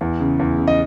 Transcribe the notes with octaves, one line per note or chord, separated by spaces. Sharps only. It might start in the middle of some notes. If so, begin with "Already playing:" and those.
E2
C#3
E2
C#3
D#5